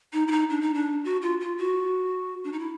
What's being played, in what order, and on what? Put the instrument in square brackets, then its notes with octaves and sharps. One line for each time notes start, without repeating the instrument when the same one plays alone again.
[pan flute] D#4
E4
D#4
D4
D#4
D4
F#4
F4
F4
F#4
D4
D#4
E4